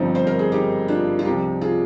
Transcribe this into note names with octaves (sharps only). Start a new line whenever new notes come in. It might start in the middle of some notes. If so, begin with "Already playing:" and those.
Already playing: G1 G2 F3 C4 D#4
C5
A#4
G#4
D#4 G4
D4 F4
F4
C2 C3 F3 D#4 G4
F4 G#4